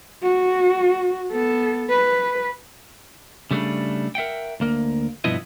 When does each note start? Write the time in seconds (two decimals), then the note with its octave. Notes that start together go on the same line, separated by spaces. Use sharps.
0.23 F#4
1.32 B3 A4
1.90 B4
3.51 C#3 G3 A3 C4 D4
4.15 A#4 E5 F#5 G5
4.60 D2 A#3 A#4
5.24 G2 B2 F3 B3 E4 D#5